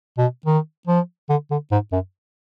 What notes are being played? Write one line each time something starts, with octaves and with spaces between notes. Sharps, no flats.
B2
D#3
F3
D3
D3
G#2
F#2